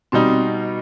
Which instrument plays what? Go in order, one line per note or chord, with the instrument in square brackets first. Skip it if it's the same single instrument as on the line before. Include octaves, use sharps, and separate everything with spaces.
[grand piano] B2 G3 D#4 [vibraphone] C4